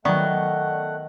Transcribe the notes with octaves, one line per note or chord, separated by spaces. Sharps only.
D#3 F#3 A3 B3 D5 F#5 C#6 F#6